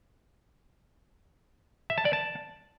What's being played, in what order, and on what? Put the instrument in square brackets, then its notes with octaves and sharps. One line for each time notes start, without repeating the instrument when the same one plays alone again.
[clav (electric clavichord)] E5
A5
D5
A5